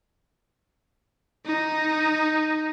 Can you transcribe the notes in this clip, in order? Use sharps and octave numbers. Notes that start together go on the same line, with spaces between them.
D#4